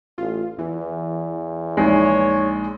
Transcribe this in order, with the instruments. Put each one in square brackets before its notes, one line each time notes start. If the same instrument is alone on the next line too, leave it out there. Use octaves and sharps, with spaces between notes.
[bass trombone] A1 [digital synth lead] F4
[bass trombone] E2 [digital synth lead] E3
[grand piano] A#1 G#3 [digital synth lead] D#4 [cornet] C#5